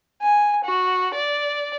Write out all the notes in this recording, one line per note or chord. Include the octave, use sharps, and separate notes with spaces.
G#5
F#4
D5